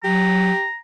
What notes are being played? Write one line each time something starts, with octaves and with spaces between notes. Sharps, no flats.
F#3 G4 A#5